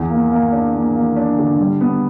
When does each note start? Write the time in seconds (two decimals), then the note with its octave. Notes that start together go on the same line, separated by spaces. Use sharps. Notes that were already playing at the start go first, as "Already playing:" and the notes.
Already playing: E2
0.10 A#3
0.31 A#3
0.52 D4
0.74 A#3
0.96 A#3
1.16 D4
1.39 D3
1.60 G3
1.81 B3